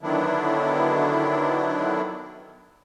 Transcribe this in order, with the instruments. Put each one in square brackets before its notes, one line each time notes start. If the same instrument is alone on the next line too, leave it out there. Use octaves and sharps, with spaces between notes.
[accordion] D3 D#3 F#3 B3 D4 E4